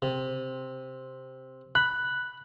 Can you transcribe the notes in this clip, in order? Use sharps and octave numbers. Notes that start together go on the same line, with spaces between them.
C3
B5 F#6